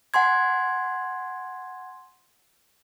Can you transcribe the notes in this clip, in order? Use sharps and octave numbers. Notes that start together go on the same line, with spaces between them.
F#5 G#5 C6 G#6